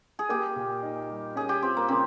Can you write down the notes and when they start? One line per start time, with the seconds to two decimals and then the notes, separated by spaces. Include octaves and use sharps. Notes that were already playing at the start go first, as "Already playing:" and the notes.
0.19 G#4
0.29 A#3 G4
0.56 A#2
0.83 D#4
1.10 G3
1.36 C#4 G#4
1.49 G4
1.62 C4 F4
1.77 A#3
1.88 C#3 C4